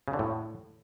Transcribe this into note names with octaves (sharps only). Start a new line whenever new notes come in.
C#3
D3
A2